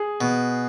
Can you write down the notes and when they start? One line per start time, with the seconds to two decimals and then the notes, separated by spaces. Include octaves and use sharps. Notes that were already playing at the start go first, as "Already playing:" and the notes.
Already playing: G#4
0.21 B2